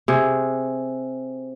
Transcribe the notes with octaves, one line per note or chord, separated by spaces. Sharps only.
C3 G#4